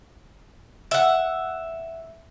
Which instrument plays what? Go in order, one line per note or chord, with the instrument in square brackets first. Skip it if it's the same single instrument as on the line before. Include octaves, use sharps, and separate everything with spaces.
[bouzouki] E5 F#5